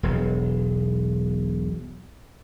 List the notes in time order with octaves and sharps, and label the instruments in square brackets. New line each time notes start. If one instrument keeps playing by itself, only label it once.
[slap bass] E1 B1